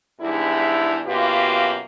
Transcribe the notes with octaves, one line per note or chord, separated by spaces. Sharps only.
E2 G#2 G3 D4 E4
F#2 B2 A#3 F4 G4 B4